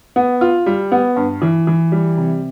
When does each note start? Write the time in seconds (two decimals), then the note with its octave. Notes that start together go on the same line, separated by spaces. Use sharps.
0.16 B3
0.41 F4
0.66 G3
0.92 B3
1.16 G2
1.42 E3
1.67 E3
1.92 G3
2.18 C3